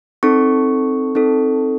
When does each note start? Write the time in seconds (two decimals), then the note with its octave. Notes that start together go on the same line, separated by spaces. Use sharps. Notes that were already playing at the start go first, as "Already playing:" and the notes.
0.23 C4 D#4 A4 C#6
1.15 C4 D#4 A4